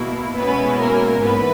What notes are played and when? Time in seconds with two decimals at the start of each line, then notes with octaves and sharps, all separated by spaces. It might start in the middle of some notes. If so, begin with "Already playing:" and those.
Already playing: B2 A#3 E4
0.36 B2 G#3 B3 C#4 E4 B4
0.79 A#3 A#4
1.21 G#2 E3 B3 B4